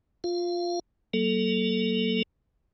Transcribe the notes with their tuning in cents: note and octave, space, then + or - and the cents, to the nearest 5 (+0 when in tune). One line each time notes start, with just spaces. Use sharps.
F4 +10 F5 -20
F#3 +30 A#3 +0 A4 -5